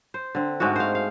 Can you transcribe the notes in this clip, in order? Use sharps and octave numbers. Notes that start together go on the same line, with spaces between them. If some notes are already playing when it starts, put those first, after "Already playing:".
C5
D3 C4
G#2 G#3 A3 F#4
C5 F5
F5